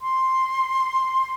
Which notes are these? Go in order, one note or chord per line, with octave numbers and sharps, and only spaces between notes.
C6